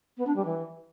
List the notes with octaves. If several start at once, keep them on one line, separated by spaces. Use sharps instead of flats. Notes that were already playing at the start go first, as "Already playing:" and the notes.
B3
D4
G3
E3